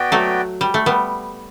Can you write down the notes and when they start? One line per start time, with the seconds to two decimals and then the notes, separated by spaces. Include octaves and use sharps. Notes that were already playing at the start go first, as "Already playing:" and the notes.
Already playing: B3 F#4 B4 D5 G5
0.12 F#3 A3
0.61 G3
0.74 A3
0.86 G3 B3